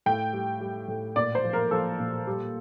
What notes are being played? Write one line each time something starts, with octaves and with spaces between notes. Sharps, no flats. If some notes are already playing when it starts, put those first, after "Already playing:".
A2 G5
G3
G3
A2
A#2 D5
C5
F3
A#4
F3 A4
A#2
G3